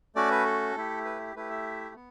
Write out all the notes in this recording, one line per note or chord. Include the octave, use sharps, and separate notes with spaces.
A3 C#4 F#4 D5
B4
A4
A3 E4 G4
B4
A3 E4 G4 B4
E5
B3